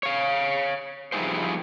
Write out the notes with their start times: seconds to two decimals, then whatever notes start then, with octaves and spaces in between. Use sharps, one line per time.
0.03 C#5 F5
1.12 F3 G3 D#4 E4 G#4 C5